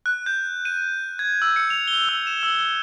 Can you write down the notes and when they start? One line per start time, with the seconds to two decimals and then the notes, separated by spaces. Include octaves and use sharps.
0.06 F#6
0.26 G6
0.65 D#7
1.19 G#6
1.42 E6
1.56 C#7
1.70 F7
1.88 G7
2.09 E6
2.27 E7
2.43 E6